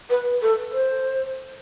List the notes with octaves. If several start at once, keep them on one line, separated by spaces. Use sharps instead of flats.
B4
A4
C5